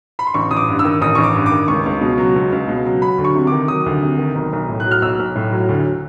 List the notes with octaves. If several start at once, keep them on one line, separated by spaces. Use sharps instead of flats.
B5
C6
A1 C#6
A1 D#6
D6
G2
E6
D#3
A1 D#6
A1 C#6
D6
G2
D6
D#3
C#2 C#6
C#2
B2
F#3
C#2
C#2
B2
F#3
F#3 B5
D2
C#6
C3
D#3 D6
F#3 D#6
D2
C3
D#3
B1
B1
A2
F#6
F#3
F6
B1 E6
B1
A2
F#3
D2